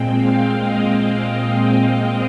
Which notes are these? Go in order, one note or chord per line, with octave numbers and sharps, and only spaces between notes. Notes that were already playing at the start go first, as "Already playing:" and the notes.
Already playing: A#2 G#3 C4 G5
F5
D#5